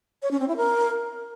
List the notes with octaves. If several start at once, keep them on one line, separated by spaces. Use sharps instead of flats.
C#5
C#4
C4
E4
A#4